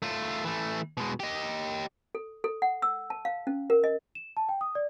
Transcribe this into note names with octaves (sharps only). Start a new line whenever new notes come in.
A3 F4
E3 A3
B2 G#3
G4 D#5
A4
A4
F#5
E6
A5
F5
C#4
A#4
D#5
E7
A5
G5
D#6
D5